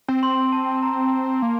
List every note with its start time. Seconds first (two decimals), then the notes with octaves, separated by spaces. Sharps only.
0.08 C4
0.23 C6
0.52 A5
0.83 A#5
1.42 A#3